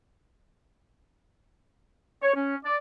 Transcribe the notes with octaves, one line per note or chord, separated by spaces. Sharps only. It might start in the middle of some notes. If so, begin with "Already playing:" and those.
C#5
C#4
D5